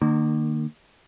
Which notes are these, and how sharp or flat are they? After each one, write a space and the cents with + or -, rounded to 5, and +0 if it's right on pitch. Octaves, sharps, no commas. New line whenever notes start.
D#3 -45 A#3 -20